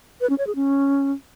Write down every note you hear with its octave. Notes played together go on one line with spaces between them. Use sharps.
B4
C#4
C#5
G#4
C#4